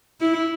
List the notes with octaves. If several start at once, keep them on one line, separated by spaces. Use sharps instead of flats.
E4